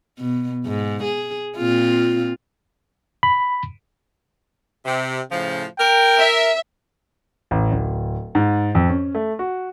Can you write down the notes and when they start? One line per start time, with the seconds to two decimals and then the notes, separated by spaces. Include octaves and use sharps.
0.19 B2
0.65 G#2
1.03 G#4
1.57 A#2 C4 F4
3.23 B5
4.85 C3
5.31 A2 C#3 F3
5.79 A#4 G5
6.18 E5
7.51 A1
7.71 D1
8.35 G#2
8.75 F2
8.89 C#4
9.15 A3
9.39 F#4